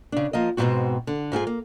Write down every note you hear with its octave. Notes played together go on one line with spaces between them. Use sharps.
C#3 D4
F3 A#3 D#5
G#2 B2 D#3 F#3 C4 F#4
D3
G#2 F4 G4 G#4
A#3